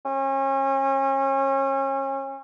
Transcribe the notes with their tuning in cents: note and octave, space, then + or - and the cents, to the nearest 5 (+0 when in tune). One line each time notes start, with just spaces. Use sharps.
C#4 -35